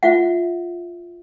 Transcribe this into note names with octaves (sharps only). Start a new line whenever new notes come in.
F4 E5 F#5